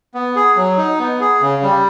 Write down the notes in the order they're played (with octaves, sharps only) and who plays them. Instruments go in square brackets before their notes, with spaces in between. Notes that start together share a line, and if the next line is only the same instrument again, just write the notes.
[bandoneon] B3
G#4
F#3
D#4
B3
G#4
C#3
G3